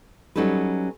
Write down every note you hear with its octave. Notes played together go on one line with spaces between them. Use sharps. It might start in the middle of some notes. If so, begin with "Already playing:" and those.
F#3 G3 C#4 D#4 A4 B4